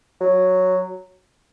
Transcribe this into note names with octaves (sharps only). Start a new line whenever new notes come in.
F#3